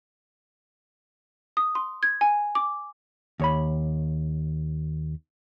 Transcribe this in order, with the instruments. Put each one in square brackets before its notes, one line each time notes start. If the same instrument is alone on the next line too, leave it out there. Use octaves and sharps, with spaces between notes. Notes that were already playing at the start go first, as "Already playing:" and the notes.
[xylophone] D#6
C6
G#6
G#5
D6
[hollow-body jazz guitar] D#2 C#5 B5